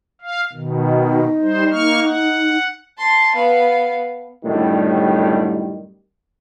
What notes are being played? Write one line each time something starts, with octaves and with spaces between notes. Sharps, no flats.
F5
B2 D#3
D#4
G3 C5
A#3 C#6 F6
F#5
A5 C6
B3 F5
F#2 A2 D3 D#3 G3